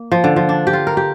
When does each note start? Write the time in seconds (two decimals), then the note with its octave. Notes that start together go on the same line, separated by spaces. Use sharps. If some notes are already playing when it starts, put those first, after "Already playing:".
Already playing: A#3
0.12 F3
0.24 D3
0.36 F3
0.49 D4
0.67 G4
0.73 F4
0.87 A#4
0.97 G4